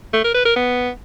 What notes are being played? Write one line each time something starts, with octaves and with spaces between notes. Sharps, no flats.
A3
A#4
B4
A#4
B3